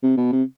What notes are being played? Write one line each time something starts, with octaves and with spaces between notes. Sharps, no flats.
C3
B2
C3